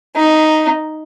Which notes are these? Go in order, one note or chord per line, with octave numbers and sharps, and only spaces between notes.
D#4